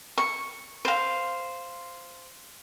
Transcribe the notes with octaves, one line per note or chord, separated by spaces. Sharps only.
C#6
C5 F5